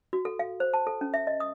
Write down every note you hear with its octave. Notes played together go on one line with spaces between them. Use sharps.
F#4
A4
F5
C5
A5
A4
C#4
E5
D#5
D#6